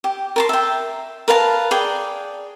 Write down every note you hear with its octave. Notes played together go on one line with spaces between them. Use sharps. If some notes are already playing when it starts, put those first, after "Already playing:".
G4
A#4 A5 C6
E5 G5
A#4 B4 F5 A5
G#4 D5 G5